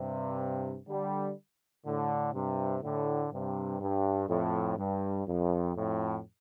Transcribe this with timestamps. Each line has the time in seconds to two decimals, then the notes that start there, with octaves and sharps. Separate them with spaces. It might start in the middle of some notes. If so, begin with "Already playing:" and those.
Already playing: G2 C3
0.88 D3 G3
1.85 A2 D3
2.33 G2 C3
2.83 A2 D3
3.31 G2 C3
3.80 G2
4.29 F2 A2
4.78 G2
5.27 F2
5.75 F2 A2